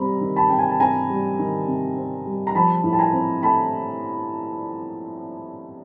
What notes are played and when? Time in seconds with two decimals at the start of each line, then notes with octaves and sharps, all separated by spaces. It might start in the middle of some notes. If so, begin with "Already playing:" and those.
Already playing: C3 G3 C4 A#5 B5
0.21 D#3
0.36 A5 B5
0.50 C3 G5
0.59 G#5
0.70 A5
0.80 C4 G#5 A#5
1.10 G3
1.39 D#3
1.67 C3
1.96 C4
2.26 G3
2.47 A#5
2.55 F3 A5 B5
2.84 A2
2.93 A5
2.99 G#5 A#5
3.13 C4
3.42 A3 A5 B5